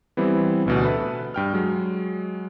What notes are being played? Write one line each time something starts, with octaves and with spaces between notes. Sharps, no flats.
E3 G3 B3 C4 E4
A1 D2 B2
A4 B4 E5
G2 G5 F6
F#3 G#3